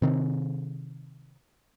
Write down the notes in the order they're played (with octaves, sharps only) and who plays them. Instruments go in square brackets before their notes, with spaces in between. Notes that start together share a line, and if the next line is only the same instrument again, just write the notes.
[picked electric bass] C3 D#3 C4